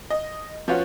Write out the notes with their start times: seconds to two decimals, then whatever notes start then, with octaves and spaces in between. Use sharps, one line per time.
0.10 D#5
0.68 F3 B3 C#4 F4 F#4